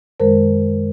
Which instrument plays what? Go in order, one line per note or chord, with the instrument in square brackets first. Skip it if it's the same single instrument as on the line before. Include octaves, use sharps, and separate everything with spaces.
[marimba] F#2 D#3 G#3 A#4 C5